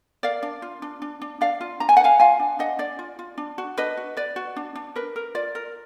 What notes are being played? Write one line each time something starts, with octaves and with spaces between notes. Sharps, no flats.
A#4 D5 F5
D4
F4
D4
D4
D4
D4 D5 F5
F4
D4 A#5
G#5
F#5
B4 F5 G#5
F4 F5 G#5
D4
D4 D#5 F#5
D4 D5
F4
F4
D4
F#4
D4 B4 D#5
F#4
B4 D5
F#4
D4
D4
A#4 B4
A#4
F4 D5
A#4